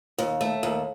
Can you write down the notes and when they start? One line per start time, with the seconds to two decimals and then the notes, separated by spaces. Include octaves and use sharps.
0.18 D#2
0.41 A3
0.63 D#2